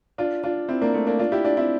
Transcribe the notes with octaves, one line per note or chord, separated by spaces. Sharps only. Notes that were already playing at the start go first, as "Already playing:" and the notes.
D4 F4
D4 F4
C4 E4
A#3 D4
A3 C4
A#3 D4
D4 F4
E4 G4
D4 F4
C4 E4